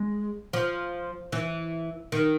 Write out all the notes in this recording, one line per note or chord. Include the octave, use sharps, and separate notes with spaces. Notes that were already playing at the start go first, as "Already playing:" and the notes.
Already playing: G#3
F3
E3
D#3